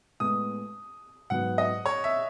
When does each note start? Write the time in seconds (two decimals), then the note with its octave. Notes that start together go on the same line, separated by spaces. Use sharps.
0.20 A2 G#3 B3 D#6
1.30 G#2 F#3 B3 F#5
1.58 D#5
1.86 C#5
2.04 E5